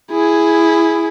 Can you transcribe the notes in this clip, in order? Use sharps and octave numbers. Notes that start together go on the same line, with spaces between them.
E4 G#4